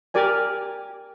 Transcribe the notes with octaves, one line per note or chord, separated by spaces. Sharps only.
G4 A#4 D5 G#5